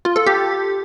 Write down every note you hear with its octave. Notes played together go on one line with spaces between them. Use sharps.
F4
A4
G4